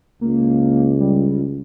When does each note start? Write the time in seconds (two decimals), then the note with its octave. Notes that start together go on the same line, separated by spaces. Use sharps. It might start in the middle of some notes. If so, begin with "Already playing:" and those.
0.21 C#2 A#3
1.00 G3